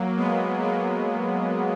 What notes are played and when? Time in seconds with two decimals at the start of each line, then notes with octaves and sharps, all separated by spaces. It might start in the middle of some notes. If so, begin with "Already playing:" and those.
Already playing: F#3 A#3
0.17 G#3 B3
0.62 F#3 A#3